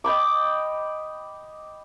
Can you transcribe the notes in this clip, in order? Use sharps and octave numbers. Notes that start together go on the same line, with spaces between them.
D#5 G5 B5 D6